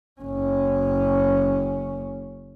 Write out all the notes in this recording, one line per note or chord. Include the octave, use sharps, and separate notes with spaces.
F#1 C#4